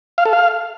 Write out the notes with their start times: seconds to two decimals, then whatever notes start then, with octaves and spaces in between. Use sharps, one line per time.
0.18 F5
0.25 A4
0.33 F5